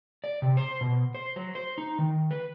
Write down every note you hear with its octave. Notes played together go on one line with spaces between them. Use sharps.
D5
C3
C5
B2
C5
F#3
C5
D#4
D#3
B4